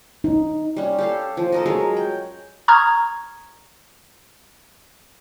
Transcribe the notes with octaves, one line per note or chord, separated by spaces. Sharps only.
D#4
G3 C#4
G4 A4 F5
F3
A4 A#4 D#5
F#3 G#3 A#4 C#5
G5
A#5 C#6 D#6 F6 G#6